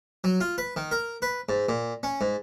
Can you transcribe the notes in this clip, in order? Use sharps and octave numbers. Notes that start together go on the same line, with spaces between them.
F#3
F4
B4
D#3
A#4
B4
G#2
A#2
C#4
G#2